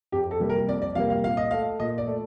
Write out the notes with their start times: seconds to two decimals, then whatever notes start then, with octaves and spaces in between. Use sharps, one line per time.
0.12 F2 G4
0.31 A4
0.40 C3 G3 A#3
0.49 A#4
0.68 F2 D5
0.82 D5
0.95 C3 G3 A#3 F5
1.10 F5
1.23 A#2 F5
1.37 D#5
1.51 A3 F5
1.80 A#2 D#5
1.98 D5
2.07 A3